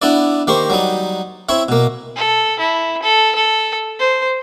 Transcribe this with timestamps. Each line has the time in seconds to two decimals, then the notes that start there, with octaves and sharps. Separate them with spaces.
0.02 B3 D4 E4 D5
0.47 D#3 A#3 G4 C5 C#6
0.70 F#3 G3 D#4
1.49 C4 E4 C#5 E5
1.68 B2 A#3
2.16 A4
2.59 E4
3.03 A4
3.35 A4
3.99 C5